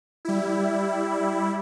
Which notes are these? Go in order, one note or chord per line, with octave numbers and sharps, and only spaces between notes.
G3 E4